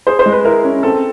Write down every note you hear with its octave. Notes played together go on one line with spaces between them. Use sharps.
G#4 C5
C5
G#3
B4
E4 A#4
C#4
C4 A4